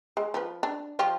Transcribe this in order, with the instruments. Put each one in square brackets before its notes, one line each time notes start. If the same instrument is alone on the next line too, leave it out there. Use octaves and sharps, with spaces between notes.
[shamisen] G#3
F3 B4
D4
F3 F4 G4